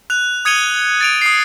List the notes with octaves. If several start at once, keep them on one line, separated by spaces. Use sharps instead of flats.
F#6 F7
D#6 G#6 C#7 D#7 F7 G7
A6 D7 F7
D#6 C7